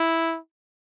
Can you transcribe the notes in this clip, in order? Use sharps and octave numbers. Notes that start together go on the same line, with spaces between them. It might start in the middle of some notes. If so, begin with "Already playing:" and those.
Already playing: E4